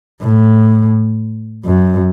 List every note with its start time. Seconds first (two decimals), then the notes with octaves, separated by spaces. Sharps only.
0.21 A2
1.65 F#2